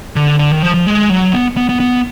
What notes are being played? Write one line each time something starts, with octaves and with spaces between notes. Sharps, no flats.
D3
D3
D#3
F3
F3
G#3
F#3
B3
B3
B3
B3